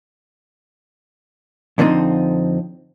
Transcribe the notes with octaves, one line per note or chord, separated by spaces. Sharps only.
F2 D3 F3 C4 D#4